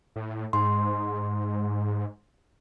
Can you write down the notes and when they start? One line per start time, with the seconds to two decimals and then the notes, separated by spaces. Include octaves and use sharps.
0.16 A2
0.53 G#2 C6